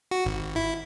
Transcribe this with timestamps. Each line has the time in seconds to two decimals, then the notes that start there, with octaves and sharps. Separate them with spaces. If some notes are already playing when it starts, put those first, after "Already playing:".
0.11 F#4
0.26 G#1
0.56 E4